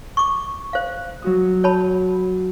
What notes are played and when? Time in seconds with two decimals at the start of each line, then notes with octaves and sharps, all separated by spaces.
0.17 C#6 D6
0.73 C5 F5
1.22 F#3 F#4 D#6
1.64 C#5 A5 B5